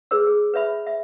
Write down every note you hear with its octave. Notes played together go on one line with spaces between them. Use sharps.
G#4 B4 C#5 E6
G#4
B4 C#5 E5 B5
E5